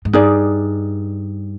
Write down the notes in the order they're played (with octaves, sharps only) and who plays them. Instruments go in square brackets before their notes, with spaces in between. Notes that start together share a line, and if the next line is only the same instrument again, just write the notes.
[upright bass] G#2
[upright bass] G2 [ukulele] D#4 G#4 D5